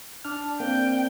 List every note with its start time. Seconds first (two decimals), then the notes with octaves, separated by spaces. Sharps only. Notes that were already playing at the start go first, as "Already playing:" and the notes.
0.25 D4 F6
0.60 A#3 C4 G5